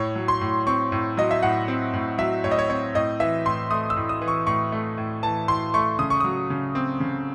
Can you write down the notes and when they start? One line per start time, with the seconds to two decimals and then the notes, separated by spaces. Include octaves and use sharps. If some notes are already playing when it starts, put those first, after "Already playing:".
Already playing: A2 C#5
0.16 F#3
0.28 C6
0.41 A2
0.67 C4 C#6
0.92 A2
1.17 F#3 D#5
1.31 E5
1.43 A2 F#5
1.68 C4
1.93 A2
2.18 F#3 E5
2.44 A2 C#5
2.51 D#5
2.59 C#5
2.70 C4 C#5
2.95 A2 D#5
3.20 E3 E5
3.46 A2 C6
3.71 A3 D#6
3.90 E6
3.96 A2
4.09 D#6
4.22 E3
4.28 C#6
4.47 A2 C#6
4.72 A3
4.98 A2
5.23 E3 A5
5.48 A2 C6
5.74 A3 C#6
5.99 C#3 D#6
6.10 C#6
6.20 F#3 D#6
6.50 C#3
6.75 C4
7.00 C#3